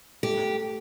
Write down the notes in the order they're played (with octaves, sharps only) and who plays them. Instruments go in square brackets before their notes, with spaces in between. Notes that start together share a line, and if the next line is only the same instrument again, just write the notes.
[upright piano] A3 [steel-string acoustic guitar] G4